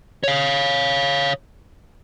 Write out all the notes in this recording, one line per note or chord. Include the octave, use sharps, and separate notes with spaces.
C#5 F5